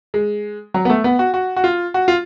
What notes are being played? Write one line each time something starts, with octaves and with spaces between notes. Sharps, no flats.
G#3
F#3
B3
A3
B3
F#4
F#4
F#4
F4
F#4
F4